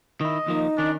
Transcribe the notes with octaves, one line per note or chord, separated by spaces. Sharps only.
D#3 E4 D#5
D#2 F3 A#3 D#4
D#3 C#4 D4